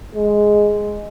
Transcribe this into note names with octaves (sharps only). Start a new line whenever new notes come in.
G#3